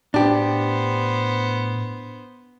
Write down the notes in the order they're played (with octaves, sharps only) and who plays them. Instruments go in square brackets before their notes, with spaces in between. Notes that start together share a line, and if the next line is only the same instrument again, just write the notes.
[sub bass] A2 [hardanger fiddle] B3 C5 [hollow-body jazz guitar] D4 G4